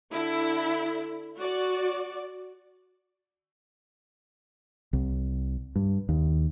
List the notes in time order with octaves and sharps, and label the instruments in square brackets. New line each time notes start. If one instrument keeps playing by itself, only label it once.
[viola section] D3 E4
F#4 D5
[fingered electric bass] C2
G2
D#2